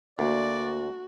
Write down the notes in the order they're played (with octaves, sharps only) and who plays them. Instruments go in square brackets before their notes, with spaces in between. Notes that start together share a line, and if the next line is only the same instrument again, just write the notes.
[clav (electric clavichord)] D2 [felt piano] A#3 [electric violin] F#4 [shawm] D5